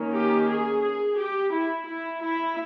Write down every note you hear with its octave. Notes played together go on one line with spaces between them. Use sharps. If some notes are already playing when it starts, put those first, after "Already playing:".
Already playing: D#3 A#3 C#4
G4
G#4
G#4
G4
E4
E4
E4